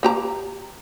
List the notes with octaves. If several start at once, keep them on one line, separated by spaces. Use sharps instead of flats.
A#3 G4 A#5